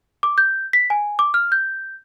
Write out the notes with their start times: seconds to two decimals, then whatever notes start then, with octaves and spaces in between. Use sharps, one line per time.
0.23 D6
0.38 G6
0.73 B6
0.90 G#5
1.19 D6
1.34 F6
1.52 G6